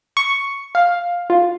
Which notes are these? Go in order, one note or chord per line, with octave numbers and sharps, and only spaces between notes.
C#6
F5
F4